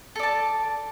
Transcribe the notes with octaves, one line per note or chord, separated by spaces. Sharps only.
A4 D5 A5